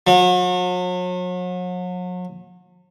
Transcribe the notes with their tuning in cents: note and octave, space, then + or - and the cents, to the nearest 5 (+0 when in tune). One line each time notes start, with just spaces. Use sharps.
F#3 -40